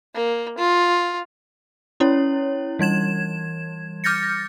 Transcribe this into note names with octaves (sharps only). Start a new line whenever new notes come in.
A#3
F4
C#4 E4 C#5
E3 G3 G#6 E7
D6 F6 G6 A6 A#6 C#7